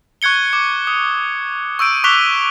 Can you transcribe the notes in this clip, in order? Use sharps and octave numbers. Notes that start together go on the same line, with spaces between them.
C#6 F#6 G#6 C#7 G7
D6
D#6
C#6 E6 G6 D7 D#7
C#6 D6 F#6 B6 F7 G7